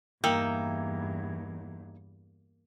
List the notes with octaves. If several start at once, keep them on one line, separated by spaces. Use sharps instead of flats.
E2 G2 A#3 D#4 E5 G5